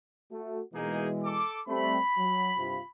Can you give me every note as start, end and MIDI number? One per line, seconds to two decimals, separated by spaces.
0.31 0.61 57
0.31 0.61 66
0.74 1.41 47
0.74 1.41 52
0.74 1.41 56
0.74 1.06 58
0.74 1.06 63
0.74 1.06 68
1.24 1.58 69
1.24 1.58 86
1.68 1.98 55
1.68 1.98 57
1.68 1.98 60
1.68 2.90 83
2.18 2.50 54
2.57 2.78 43
2.57 2.78 48
2.57 2.78 65